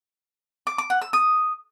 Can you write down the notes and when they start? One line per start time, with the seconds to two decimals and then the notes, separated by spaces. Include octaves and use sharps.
0.67 D6
0.78 D6
0.90 F#5
1.02 E6
1.13 D#6